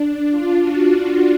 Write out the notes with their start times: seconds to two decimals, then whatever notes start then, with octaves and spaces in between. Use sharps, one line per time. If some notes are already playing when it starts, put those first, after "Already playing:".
Already playing: D4
0.31 F4
0.62 F#4